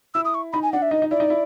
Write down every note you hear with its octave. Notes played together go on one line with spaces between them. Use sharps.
E4 E6
D#6
C#6
D#4 B5
G#5
D4 F#5
E5
D#4 D#5
D#4
E4 D5
D#4
E4